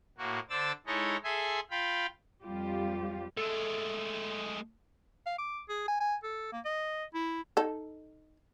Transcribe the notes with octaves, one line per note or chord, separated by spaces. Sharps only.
A2 A#3 F#4
D3 D4 C5 D5 E6 A6
G#3 D#4 E4 A4 C#5 D#5
G#4 A4 E5 G#5 C6
F4 F5 G5 B5
F2 G3 F4 G4
G#3 A3 A4
F5
D6
G#4
G#5
G#5
A4
A#3
D#5
E4
D#4 A4